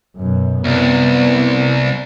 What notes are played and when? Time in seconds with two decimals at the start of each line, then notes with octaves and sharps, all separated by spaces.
0.17 F#2 B2
0.64 C2 B3